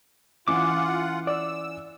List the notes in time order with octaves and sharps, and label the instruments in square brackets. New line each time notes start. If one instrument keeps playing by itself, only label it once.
[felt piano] E3 C#4 [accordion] F4 F#5 [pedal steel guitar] D6
[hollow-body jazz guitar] D5 [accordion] E6